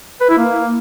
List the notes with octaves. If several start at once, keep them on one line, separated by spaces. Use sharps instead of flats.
B4
E4
A#3